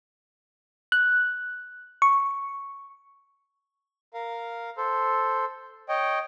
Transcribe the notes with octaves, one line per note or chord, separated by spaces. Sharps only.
F#6
C#6
A#4 F5
A4 C5
C#5 D#5 G5